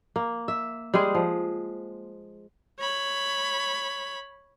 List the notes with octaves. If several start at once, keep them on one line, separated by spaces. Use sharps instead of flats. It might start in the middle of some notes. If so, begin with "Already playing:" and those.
A#3
E5
G3 G#3 G#4 C5
F3
C#5 B5